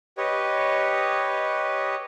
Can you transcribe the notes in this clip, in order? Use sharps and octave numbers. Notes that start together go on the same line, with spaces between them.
G4 B4 C#5 D#5